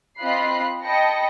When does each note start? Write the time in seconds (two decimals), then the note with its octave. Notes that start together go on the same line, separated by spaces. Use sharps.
0.20 C4 F4 D#5 B5 F#6 C7
0.85 D#5 G5 A5 B5 A#6 C#7